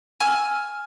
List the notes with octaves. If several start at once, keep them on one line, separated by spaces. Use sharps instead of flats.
G#5 E6 F6